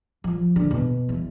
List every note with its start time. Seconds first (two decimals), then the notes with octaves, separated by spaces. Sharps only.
0.24 F3
0.56 D3
0.71 B2
1.09 E2